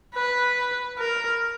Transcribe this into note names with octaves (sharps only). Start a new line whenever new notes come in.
B4
A#4